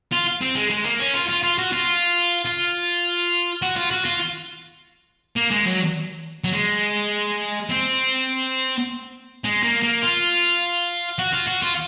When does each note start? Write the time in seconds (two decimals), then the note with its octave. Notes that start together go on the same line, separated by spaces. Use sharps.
0.12 F4
0.41 C4
0.56 G#3
0.70 G#3
0.85 A#3
1.00 C#4
1.14 F4
1.29 F4
1.43 F4
1.58 F#4
1.72 F4
2.45 F4
3.62 F#4
3.76 F4
3.91 F#4
4.05 F4
5.36 A#3
5.51 G#3
5.65 F#3
6.44 F#3
6.53 G#3
7.69 C4
9.44 G#3
9.63 A#3
9.83 A#3
10.02 F4
11.19 F#4
11.33 F4
11.47 F#4
11.62 F4